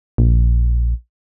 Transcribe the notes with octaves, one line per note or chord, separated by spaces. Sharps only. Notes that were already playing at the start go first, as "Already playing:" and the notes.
A#1